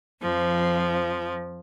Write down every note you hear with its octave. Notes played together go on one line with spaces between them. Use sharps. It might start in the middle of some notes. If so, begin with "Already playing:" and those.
F2 F3